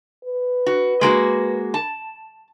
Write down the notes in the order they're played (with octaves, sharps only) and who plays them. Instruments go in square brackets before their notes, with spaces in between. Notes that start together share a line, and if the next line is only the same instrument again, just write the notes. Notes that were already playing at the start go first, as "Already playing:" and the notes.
[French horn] B4
[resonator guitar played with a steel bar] F#4
G#3 A#3 F#4
A5